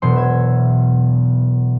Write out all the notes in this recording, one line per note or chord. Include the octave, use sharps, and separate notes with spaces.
E1 B2 F#3 C5 C6
E5 G#6